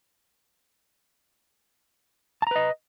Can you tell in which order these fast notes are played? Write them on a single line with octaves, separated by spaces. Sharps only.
A5 A#5 B4 D#5